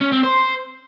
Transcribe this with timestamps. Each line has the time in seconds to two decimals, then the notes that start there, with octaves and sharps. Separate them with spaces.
0.01 C#4
0.12 C4
0.23 C5